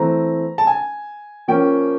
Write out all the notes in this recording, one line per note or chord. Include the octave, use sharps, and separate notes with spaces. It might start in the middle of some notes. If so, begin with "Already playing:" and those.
Already playing: E3 A3 C4 A#5
A5
G#5
F3 A#3 C#4 G5